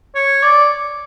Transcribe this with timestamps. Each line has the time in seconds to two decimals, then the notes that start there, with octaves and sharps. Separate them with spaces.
0.15 C#5
0.43 D5